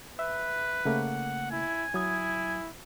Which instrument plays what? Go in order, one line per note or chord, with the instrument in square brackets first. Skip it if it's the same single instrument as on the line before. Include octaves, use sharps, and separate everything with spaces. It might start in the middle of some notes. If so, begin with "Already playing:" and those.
[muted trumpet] B4 [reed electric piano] E5
[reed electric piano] C#3 A3 A#3 [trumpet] F#5
[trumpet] E4 [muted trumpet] G#5
[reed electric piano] F#3 D#6 G#6 [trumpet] E4